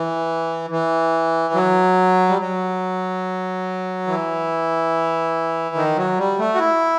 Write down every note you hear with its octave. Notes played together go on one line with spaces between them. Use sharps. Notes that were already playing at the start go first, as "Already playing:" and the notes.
Already playing: E3
E3
F#3
G3
F#3
E3
D#3
F#3
G3
A3
F#4
E4